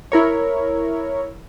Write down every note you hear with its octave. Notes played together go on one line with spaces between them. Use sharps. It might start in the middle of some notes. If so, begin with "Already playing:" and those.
E4 A#4 C#5